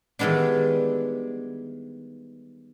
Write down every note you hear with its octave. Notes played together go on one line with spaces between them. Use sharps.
D#3 E3 G3 G#3 B3 D4